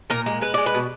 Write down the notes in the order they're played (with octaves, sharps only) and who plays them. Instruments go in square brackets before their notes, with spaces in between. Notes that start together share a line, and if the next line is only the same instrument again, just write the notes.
[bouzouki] A#2 A#4
G#3
G#3 B4
G#3 D5
B4
B2